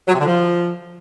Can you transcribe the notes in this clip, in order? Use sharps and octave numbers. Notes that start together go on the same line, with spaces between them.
F#3
C3
D3
F3